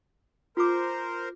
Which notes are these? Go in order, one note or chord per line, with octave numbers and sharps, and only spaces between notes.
F4 A#4 C5 D6